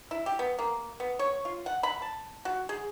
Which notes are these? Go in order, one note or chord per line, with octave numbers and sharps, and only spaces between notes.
E4
G4
B3
A#3
B3
C#5
F4
F#5
B5
A5
F#4
G#4